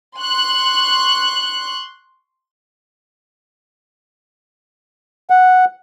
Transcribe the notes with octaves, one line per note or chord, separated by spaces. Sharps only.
C6 C#6 F#6
F#5